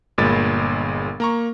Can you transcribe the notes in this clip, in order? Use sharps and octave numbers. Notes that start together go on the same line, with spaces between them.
G1 A#2 G#3 B5 A6
A#3 A#5 C#6